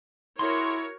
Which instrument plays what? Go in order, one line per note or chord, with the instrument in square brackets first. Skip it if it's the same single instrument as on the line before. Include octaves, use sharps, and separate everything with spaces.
[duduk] E4 [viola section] F#4 A#4 C#5 [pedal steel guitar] G#4 C6